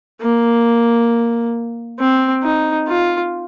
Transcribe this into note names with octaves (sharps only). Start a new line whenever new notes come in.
A#3
C4
D#4
F4